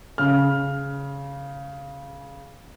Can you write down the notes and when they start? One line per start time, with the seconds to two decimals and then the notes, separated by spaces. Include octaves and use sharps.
0.18 C#3 F6